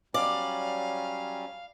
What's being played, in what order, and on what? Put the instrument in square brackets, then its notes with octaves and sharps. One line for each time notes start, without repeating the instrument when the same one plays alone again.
[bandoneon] F#3 G3 C#4 [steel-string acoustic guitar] D5 [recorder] F5